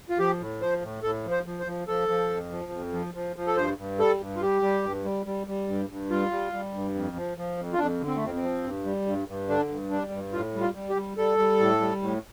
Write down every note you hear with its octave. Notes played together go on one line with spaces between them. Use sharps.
F4
F3 G4
A2
F3 C5
A2
A2 A4
F3
C5
F3
C5
F3
F3 A4
F3
F2
F3
F2
F3
F3
F3
A4
G2 C5
G2
G3 A4
G2
F4
G3 G4
G3
G2
G3
G3
G3
G2
G2
G3 F4
G3
G3
G2
F2
F3
F3
F2
F4
F2 D4
D3
C4
A3
F2 C4
C4
F3
G2
G3
G2
G2
D3 D4
G2
G3 D4
G2
A2 F4
G3
F4
G3
G4
G3
G3 A4
G3
A2
G3
A2